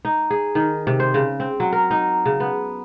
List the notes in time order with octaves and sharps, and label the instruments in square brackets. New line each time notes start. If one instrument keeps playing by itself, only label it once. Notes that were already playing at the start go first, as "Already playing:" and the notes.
[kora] D#4
G#4
D#3
C3
C5
C#3
C4
F#3
A#4
D#4
C#3
B3